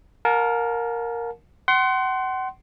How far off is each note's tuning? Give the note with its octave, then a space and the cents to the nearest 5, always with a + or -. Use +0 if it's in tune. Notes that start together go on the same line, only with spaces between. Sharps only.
A#4 +0 F5 +45 A5 -30
F#5 +35 C6 +0